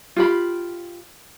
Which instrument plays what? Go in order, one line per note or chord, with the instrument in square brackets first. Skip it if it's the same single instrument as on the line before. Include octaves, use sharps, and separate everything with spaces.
[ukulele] F4 G4 B5